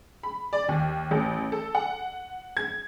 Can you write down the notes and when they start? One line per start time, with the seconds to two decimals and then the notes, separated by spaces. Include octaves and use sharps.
0.23 B5
0.53 D5
0.68 D#2
1.11 A1
1.52 A4
1.75 F#5
2.57 G#6